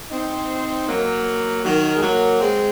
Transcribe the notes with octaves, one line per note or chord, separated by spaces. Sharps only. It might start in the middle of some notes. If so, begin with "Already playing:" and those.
C4 D#4
F#3 A#3
D#3 F#3
G#3
F#3 A#3
G#3 C4